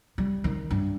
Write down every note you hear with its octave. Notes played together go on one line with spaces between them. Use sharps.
G3
D#3
G2